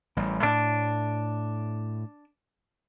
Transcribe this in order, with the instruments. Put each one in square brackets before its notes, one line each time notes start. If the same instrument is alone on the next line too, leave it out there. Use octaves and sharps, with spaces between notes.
[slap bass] A1 G3
[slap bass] A2 [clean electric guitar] D4